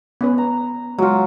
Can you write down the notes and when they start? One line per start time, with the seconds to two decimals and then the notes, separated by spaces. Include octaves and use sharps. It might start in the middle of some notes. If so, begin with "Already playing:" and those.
0.21 B3 C#4 B4
0.38 A#5
0.98 F#3 G#3 F4 F#4